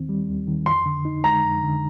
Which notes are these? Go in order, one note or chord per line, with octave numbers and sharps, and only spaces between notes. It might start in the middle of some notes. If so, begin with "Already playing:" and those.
Already playing: D#2 D#3 C4
G3
D#2
D#3
F2 C6
D3
D#4
G#3 A#5
F2
D3